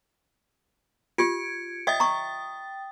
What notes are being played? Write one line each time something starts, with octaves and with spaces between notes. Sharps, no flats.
F4 G4 G#6 C#7 D7
C#5 D#5 E5 G5 D#6 A6
A#5 C#6